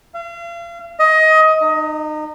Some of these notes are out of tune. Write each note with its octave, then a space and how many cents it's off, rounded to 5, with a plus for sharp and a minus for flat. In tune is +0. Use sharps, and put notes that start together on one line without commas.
F5 -40
D#5 +20
D#4 -30